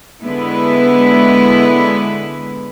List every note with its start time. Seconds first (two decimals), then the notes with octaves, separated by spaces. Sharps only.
0.22 D3 G#3 B3 E4 B4